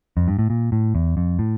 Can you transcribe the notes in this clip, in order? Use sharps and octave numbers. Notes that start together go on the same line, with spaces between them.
F2
G2
A2
A#2
A2
E2
F2
A2